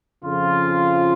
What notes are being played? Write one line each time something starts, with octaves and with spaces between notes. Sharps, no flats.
F2 C#3 F3 F4